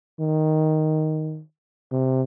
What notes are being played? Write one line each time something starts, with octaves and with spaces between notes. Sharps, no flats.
D#3
C3